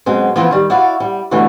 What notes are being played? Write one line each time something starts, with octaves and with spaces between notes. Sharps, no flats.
F#2 B2 G#3 C4
E3 F3 B3 C4 E4 F4
D#3 G3
E4 F#4 D5 F5
G3
B2 D3 E3 G3 A3